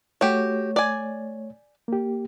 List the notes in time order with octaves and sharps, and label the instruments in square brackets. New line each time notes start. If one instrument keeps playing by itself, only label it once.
[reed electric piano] A3 C#5 [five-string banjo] F#4 G4
[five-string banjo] D5 G#5
[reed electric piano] A#3 G4